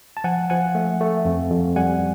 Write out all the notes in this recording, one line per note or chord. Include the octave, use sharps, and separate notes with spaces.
A5
F3 F#5 G#5
F3 F#5 G#5
A3
A3
F2
F2
G3 F#5 G#5